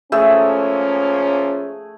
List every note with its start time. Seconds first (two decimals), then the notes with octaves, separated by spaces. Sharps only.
0.12 F3 A3 A#3 C#4 G#4 E6